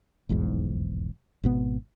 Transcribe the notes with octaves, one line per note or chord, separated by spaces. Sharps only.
F1 B1 E2 G#2
G#1 B2 B3